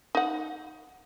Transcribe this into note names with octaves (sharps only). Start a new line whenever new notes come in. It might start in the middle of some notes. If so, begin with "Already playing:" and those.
D#4 F#5